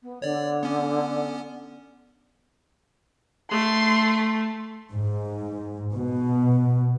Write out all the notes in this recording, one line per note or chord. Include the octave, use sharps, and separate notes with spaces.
B3
D3 C#5 D5
B3 C#4
A3 C6
G#2
B2